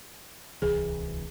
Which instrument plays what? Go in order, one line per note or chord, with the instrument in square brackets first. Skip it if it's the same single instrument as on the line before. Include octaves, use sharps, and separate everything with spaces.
[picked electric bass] D1 C2 E3 [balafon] G#4